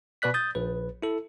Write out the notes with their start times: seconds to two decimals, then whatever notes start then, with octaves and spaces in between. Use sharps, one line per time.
0.22 B2 B4 D5 F#6 B6
0.34 D#6 G6 A6
0.55 A#1 B4
1.02 E4 A4